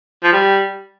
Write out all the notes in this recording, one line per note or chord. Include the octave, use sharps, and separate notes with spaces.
F3
G3